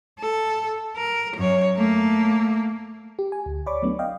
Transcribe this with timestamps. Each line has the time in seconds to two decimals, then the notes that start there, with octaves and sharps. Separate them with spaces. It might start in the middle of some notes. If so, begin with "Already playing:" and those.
0.19 A4
0.96 A#4
1.36 F#2 C#5
1.76 A3 A#3
3.19 G4
3.32 G#5
3.46 D2
3.66 C#5 D5 B5 C#6 D6
3.82 F#3 A3 B3 D4
3.99 D#5 F5 G5